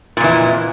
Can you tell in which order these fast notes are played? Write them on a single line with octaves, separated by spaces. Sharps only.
A#2 F2 E3